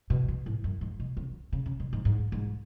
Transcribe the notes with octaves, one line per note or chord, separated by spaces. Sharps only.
B2
B2
A2
F#2
G#2
B2
C#3
C#3
C#3
B2
G#2
G#2
G#2